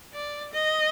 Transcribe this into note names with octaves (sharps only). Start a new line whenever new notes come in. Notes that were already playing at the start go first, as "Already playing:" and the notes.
D5
D#5